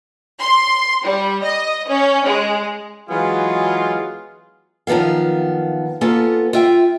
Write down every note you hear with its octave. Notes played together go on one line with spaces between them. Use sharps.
C6
G3
D#5
C#4
G#3
E3 F#3 G#3 B3 F4 G#4
F#2 D#3 F3 B3 F5
A#3 B3 C#4 F4 A4
F4 E5 G5